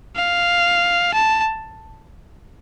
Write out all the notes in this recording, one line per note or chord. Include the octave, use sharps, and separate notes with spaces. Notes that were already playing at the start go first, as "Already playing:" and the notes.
F5
A5